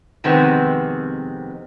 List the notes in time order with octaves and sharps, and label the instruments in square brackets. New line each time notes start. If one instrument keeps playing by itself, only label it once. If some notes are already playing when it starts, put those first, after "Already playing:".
[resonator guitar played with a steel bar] F2 C3 D#3 G#3 B3 C4